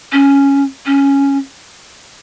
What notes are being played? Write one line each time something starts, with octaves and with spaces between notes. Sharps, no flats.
C#4
C#4